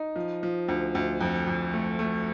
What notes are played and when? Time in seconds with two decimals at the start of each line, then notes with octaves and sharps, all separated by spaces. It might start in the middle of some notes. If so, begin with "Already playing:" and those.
Already playing: D#4
0.16 F3
0.43 F3
0.68 D2
0.95 D2
1.21 F2
1.47 F2
1.73 A3
1.99 A3